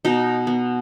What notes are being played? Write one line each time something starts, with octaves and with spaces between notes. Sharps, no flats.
B2 D#4
B3